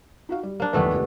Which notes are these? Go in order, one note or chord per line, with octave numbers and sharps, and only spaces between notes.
D#4 F#4 F5
G3
A#3 D4
A#1 D#2 E3 A3 B3
C#2 G4